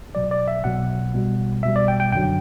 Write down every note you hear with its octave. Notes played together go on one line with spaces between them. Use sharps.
B1 B2 F#3 D5
D5
E5
B1 B2 F#3 F#5
B1 B2 G3
B1 B2 G3 E5
D5
G5
G5
F#2 D3 F#3 G5